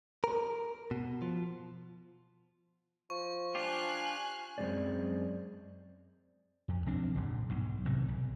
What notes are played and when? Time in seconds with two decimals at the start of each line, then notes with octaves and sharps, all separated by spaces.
0.24 A#4
0.91 B2
1.22 F3
3.10 F3 C#6
3.55 D4 F4 G4 G#5 F6 F#6
4.58 F#2 F3 G#3 C4 D5
6.68 F2
6.86 B1 F3 C4 D4
7.15 F#1 A#2 D3
7.49 B1 G#2
7.85 G#1 A2 C3 D#3
8.08 B1